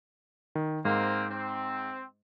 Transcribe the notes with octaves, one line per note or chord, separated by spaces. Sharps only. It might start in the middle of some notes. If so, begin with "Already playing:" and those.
D#3
G#2 A#3 C4
C4